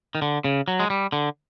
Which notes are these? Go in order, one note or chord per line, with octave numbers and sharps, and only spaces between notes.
D#3
D3
C#3
F#3
G#3
G3
D3